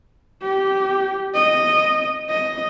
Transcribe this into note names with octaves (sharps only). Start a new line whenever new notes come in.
G4
D#5
D#5